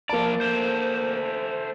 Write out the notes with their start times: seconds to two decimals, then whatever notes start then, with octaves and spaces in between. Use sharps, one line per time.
0.09 F3 A#3 D5 A5
0.41 A3 C5